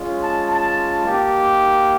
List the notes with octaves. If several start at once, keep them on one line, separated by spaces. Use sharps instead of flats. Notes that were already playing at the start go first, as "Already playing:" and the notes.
Already playing: G#3 C#4 F4
A5
A5
A#3 D#4 G4